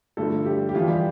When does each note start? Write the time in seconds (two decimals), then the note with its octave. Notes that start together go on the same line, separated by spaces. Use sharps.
0.17 G2 D3 F3 A3 A4
0.45 G3 G4
0.69 G4
0.75 F2 E3 G3 F4
0.88 G3 G4